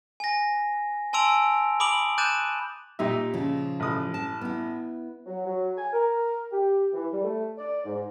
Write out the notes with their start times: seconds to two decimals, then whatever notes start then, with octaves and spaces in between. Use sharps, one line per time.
0.20 G#5 A#6
1.13 G#5 A5 C6 E6 D7 F7
1.80 B5 D6 D#6 D7 F7 F#7
2.18 D6 F#6 G6 A6 D#7 E7
2.99 A#2 A#3 D#4 F4 G4 E5
3.34 C#3 F3
3.80 A1 D#6
4.14 A5
4.41 B3 E4
5.26 F#3
5.46 F#3
5.77 G#5
5.93 A#4
6.52 G4
6.94 E3
7.12 G3
7.24 A3
7.58 D5
7.85 G#2